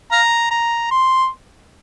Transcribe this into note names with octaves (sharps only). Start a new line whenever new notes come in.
F5 A#5
A#5
C6